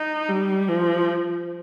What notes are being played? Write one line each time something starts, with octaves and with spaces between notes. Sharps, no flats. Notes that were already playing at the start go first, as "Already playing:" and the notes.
Already playing: D#4
G3
F3